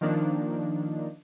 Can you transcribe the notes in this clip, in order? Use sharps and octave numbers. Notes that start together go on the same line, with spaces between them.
D#3 F3 A#3 D4 D#4